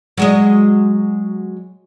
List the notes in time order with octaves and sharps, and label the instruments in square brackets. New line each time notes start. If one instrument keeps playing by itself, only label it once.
[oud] F#3 G#3 D#5